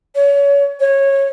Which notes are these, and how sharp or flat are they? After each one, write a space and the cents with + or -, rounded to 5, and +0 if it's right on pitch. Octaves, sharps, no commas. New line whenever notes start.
C#5 +30
C#5 -15